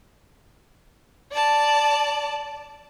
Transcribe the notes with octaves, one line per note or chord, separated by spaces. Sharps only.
D5 A5